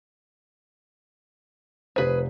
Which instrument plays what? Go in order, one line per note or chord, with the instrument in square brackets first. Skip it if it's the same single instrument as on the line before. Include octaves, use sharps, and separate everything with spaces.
[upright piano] F1 C5 [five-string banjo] G#4 B4